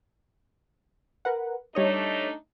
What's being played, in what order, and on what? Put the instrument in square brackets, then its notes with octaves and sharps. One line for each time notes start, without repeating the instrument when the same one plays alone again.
[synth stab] A#4 B4 F#5
[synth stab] G3 C#5 D#5 [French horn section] A3 D4 D#4